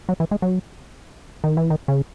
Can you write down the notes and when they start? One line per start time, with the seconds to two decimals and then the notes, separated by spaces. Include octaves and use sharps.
0.09 F#3
0.20 E3
0.31 G#3
0.42 F#3
1.44 D#3
1.57 E3
1.70 D#3
1.88 C#3